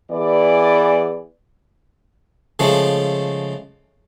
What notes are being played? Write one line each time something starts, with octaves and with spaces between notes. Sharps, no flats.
E3 B3 G#4 D5
C#3 F3 G#3 A3